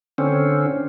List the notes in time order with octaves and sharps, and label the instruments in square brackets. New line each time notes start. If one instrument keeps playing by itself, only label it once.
[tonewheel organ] D3 C4 C#4